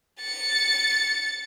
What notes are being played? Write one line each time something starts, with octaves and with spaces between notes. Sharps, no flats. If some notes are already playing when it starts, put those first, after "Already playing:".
A6 C#7